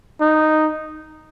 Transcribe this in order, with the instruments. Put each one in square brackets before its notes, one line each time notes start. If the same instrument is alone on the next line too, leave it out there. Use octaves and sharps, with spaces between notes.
[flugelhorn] D#4